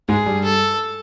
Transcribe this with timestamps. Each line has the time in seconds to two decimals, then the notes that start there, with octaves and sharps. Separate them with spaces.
0.08 G#2 G#3 G#4
0.26 G2 G3
0.44 A4